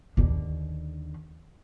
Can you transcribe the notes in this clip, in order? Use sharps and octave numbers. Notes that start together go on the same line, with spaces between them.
D#2 D3